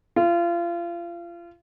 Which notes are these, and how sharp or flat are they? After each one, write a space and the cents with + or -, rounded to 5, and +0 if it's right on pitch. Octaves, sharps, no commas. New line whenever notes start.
F4 -30